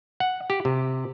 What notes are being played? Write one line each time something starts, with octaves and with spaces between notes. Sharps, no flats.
F#5
G4
C3